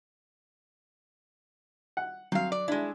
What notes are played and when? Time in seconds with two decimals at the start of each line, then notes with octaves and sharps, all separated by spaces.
1.97 F#5
2.32 F#3 C4 F5
2.52 D5
2.68 G#3 D4 E4